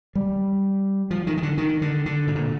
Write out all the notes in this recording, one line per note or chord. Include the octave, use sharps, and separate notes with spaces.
G3
F3
D#3
D#3
D3
D#3
D3
D3
A2
A#2